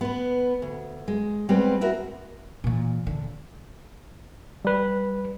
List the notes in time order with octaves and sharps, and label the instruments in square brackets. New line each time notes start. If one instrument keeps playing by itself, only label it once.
[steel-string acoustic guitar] B3 B4
D2
G#3
G3 G#3 B3 C4 G4 B4
E4 F#4 A#4
[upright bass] A#2 E3
D3
[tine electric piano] G3 B4